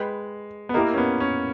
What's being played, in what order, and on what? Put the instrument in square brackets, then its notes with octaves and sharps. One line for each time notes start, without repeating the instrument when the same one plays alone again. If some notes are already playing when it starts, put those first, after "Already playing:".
Already playing: [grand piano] G#3 [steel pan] B4 G5 B5
[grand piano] B3
[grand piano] A#3 [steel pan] E4 G4 A#4 D#5
[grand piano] C#4
B3
C#4